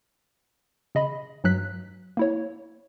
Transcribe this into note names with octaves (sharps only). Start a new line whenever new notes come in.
C#3 D#5 B5
G2 F#3 F#6 B6
A#3 E4 C#5